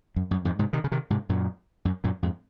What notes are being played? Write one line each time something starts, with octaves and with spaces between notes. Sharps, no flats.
F#2
F#2
F2 G#2
G#2 C3
C3 D#3
C#3
C3 D#3
G#2 C3
F#2 A#2
F#2
F#2 A#2
F2 G#2